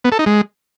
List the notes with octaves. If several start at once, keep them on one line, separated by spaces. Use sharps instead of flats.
B3
A4
D#4
G#3